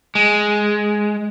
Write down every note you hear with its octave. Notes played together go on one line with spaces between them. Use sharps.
G#3